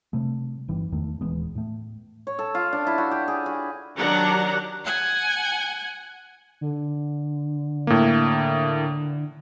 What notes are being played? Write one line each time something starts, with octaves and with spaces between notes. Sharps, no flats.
C3 G3 A3
G1 E3 G3
E2 D#3 A3
D#1 E3 G#3 B3
A2 A3
C#5
A4
F4
D4
E4
F#4
G4
G#4
F#4
D#3 F#3 D4 G4 F#5 A#5
F#5 G#5
D3
A2 A#3